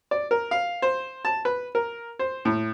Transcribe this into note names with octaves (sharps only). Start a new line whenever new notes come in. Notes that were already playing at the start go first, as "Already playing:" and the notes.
D5
A#4
F5
C5
A5
B4
A#4
C5
A2